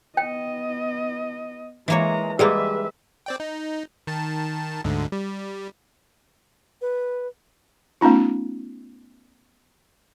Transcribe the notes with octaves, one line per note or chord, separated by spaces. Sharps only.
B3 D#5 G5
E3 G#3 A#3 C#5 A#5
G3 G#3 A#3 G4 G#4 B4 D#5 E5
C4 D5 G5
D#4
D#3 A5
D2 G#2 D3
G3
B4
A3 B3 C#4 D#4 F4